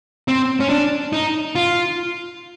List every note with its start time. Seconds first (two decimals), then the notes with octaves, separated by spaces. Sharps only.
0.28 C4
0.60 C#4
0.70 D4
1.13 D#4
1.55 F4